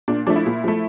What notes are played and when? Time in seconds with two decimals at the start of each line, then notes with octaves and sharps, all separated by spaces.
0.08 A#2 D4
0.27 F3 A3 D4
0.36 E4
0.46 A#2
0.64 F3 A3